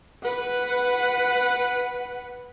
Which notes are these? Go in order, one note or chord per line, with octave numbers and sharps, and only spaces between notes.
B4 F#5